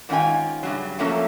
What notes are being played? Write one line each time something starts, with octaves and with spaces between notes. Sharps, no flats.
G#2 D#3 C#4 F4 G5 G#5
G2 C#3 F#3
F3 F#3 A3 A#3 C#4 A4